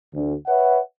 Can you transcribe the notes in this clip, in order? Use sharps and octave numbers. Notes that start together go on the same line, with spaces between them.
D2
B4 C#5 E5 F#5